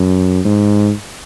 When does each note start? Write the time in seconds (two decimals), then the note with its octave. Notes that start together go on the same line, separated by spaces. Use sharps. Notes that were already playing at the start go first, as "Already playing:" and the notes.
Already playing: F#2
0.45 G#2